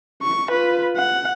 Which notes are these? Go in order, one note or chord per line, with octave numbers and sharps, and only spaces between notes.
C#6
F4 B4
F#5